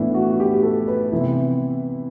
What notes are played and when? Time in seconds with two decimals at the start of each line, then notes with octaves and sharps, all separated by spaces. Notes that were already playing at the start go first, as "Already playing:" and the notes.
Already playing: A2 E3 B3 D4 E4
0.14 F#4
0.30 F#4
0.40 G4
0.63 A4
0.88 B4
1.12 C3 E3 B3 E4